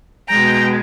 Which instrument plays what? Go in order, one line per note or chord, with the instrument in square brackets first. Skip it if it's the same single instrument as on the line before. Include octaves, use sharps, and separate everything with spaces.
[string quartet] B2 G#3 G5 A#5